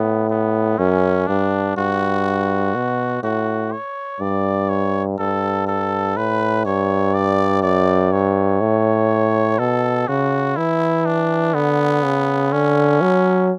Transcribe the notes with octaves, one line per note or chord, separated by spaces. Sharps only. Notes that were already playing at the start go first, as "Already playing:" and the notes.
Already playing: A2 B3
B3
F#2 C#4
G2 D4
G2 F#4
B2
A2 F#4
C#5
G2 D5
C#5
G2 A4
A4
A2 B4
G2 C#5
D5
F#2 D5
G2 C#5
A2
B2 A4
C#3 F#4
E3 E4
D4
D3 B3
C#3
D3 C#4
F#3